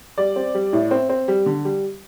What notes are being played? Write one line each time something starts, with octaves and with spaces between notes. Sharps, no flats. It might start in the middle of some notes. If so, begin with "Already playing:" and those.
G3 D5
C4
G3
A2
C4
C4
G3
D3
G3